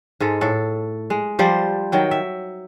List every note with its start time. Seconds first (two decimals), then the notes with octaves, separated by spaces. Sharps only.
0.20 G#2 G#3 A4
0.41 A2 A4
1.10 G#3
1.39 F3 G3 C5 D5
1.92 D#3 F#3 G5
2.11 E5